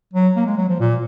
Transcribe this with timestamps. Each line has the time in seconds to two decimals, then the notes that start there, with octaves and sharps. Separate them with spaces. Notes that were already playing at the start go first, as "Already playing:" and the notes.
0.13 F#3
0.36 A#3
0.46 G#3
0.57 F#3
0.69 F3
0.80 A#2